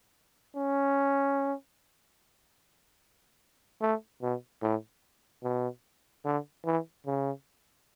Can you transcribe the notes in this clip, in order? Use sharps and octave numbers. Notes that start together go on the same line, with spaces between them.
C#4
A3
B2
A2
B2
D3
E3
C#3